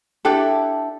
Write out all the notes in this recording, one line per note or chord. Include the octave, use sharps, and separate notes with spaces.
D4 E4 G4 A4